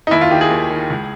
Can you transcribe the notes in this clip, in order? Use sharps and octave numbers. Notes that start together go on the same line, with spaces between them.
D#4
D#2 E4
F4
D#3 G4
G#4
D#2
D#3
C#2